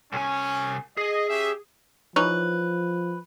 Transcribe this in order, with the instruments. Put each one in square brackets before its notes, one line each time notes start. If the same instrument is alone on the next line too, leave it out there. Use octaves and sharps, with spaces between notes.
[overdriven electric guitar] C2 G#5 [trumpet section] C#4
[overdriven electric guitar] G#4 [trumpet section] D#5
[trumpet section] C#4 G4 E5
[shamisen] E3 D#4 C#5 [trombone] F3 [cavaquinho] B4